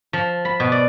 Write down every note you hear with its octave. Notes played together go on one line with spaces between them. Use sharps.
F3
B5
B2
D5